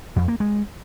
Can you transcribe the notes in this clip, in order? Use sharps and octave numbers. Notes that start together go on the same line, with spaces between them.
F2
A#3
G#3